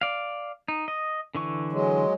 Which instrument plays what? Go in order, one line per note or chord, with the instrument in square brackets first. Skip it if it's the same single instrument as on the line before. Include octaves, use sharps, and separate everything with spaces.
[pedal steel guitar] D5 F5
D#4
D#5
D3 E3 C#6
[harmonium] F#3 G#3